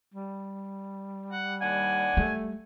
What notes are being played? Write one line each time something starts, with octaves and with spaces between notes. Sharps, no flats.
G3
F#5
D#2 D4 F#5 G#5
G3 A3